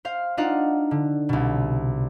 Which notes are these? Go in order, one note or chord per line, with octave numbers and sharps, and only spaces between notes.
C5 F5
D4 D#4 F4 F5 F#5
D3
C2 B2